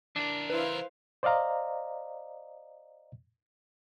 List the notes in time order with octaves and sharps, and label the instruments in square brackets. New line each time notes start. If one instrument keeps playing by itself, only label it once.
[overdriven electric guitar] E3 A#4 [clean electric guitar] D4
[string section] E4 C5 F5 [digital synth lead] B4
[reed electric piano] C5 D5 D#5 F5 A#5